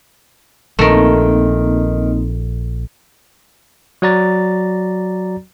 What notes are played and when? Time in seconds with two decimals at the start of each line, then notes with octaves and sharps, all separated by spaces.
0.79 A#1 D#3 A3 A#3 C4 D#4 A#4
4.02 F#3 F#4 D5 A#5 A6